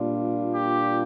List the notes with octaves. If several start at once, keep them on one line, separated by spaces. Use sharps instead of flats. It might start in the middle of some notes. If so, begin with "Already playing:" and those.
Already playing: A#2 G3 D4 F4
G4